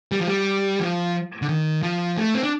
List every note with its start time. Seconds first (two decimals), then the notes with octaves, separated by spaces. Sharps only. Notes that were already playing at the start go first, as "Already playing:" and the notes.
0.12 G3
0.19 F3
0.28 G3
0.80 F3
1.42 D3
1.49 D#3
1.83 F3
2.17 A3
2.34 C4
2.43 D4